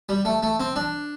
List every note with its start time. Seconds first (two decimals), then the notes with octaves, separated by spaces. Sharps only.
0.09 G3
0.25 A3
0.43 A3
0.60 C4
0.76 D4